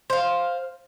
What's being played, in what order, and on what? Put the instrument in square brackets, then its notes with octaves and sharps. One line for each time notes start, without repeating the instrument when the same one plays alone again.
[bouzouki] C5 F5